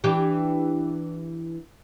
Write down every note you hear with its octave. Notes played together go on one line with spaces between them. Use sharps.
E3 D4 G4